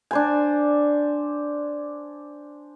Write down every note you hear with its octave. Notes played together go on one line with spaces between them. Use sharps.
D4 C5 G#5